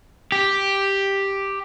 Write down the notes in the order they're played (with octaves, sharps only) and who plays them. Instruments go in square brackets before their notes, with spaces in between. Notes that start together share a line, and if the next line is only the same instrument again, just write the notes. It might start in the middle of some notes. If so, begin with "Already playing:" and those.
[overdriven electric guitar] G4